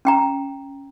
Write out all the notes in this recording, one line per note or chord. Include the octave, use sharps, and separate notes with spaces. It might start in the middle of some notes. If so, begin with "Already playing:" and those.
C#4 G5 A#5